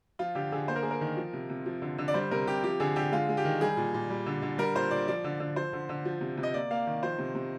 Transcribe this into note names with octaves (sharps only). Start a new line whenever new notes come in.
F3 F4
D3 G4
D3 G#4
A#3 C5
A#4
A#3 G#4
A#4
D#3
F3
C3
C3
F3
D3
D3
D5
G3 C5
C3 A#4
C3 G4
F3 G4
D3 G#4
D3 G4
G#3 F4
G#3
G4
D#3
G3 G#4
A#2
A#2
G3
D3
D3
G3 A#4
A#2 C5
A#2 D5
F3 D5
D3
D3
F3 C5
D3
D3
F3
C3
C3
D#5
A#3 D5
A#3 F5
D#3
F3 C5
C3
C3